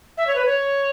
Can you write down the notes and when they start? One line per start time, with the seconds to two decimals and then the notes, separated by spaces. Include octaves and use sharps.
0.17 E5
0.27 C#5
0.36 B4
0.46 C#5